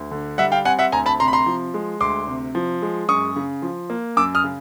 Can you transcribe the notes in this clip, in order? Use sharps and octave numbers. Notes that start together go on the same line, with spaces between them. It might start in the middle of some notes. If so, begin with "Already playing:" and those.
Already playing: D2
D3
G3 E5 F#5
F5 G5
C4 F#5 G#5
E5 F#5
D2 G#5 A#5
A5 B5
C3 A#5 C6
B5
A#5 C6
F3
G#3
D2 C6 D6
C3
F3
G#3
F#2 C#6 D#6
C#3
F3
A#3
F#2 D6 E6
D#6 F6
C#3